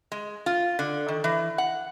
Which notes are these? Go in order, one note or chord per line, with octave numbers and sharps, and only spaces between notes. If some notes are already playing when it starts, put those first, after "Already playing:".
G#3
F4
D3
D#3
E3
F#5